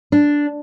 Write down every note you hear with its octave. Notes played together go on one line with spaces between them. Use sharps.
D4